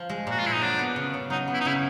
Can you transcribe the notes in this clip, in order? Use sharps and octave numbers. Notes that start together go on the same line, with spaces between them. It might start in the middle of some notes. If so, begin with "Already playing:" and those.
Already playing: F3
G#3
A#2 F#4
F4
A#2 E4
D#4
F#3 D4
B3
C#3
C#3
F#3 D#4
B3
E4
D#4
C#3 E4